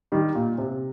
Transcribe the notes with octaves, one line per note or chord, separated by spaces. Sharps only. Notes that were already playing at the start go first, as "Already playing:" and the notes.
D#3 G3
A#2
C3